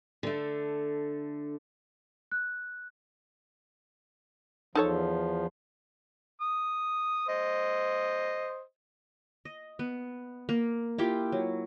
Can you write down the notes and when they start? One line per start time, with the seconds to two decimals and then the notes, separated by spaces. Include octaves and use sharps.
0.23 D3 A3
2.32 F#6
4.75 E2 F3 D#4 A4 C#5
6.41 D#6
7.28 C5 D#5
9.45 D#5
9.79 B3
10.49 A#3
10.98 E4 F4 G4
11.32 F#3